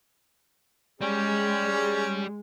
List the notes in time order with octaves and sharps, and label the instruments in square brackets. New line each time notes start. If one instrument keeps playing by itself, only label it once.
[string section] G#3 [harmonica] C#4 [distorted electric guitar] G4 D5